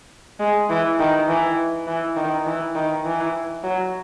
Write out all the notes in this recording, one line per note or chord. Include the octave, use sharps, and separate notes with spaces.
G#3
E3
D#3
E3
E3
D#3
E3
D#3
E3
F#3